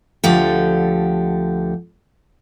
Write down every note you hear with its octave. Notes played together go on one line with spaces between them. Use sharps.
D2 D3 F3 G4